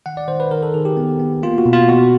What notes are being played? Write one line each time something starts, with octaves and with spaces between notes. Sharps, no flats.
D#3 F#5
D5
D#3 C5
B4
D#3 A#4
A4
D#3 G#4
G4
B3
B3
A#3 F4
F#4
B2
F4
B2 F#4